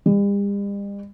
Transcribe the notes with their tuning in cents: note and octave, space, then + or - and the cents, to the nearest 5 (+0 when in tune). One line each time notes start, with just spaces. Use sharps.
G3 +45